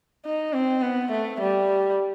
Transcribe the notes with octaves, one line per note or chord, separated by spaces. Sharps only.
D#4
C4
B3
A3
G3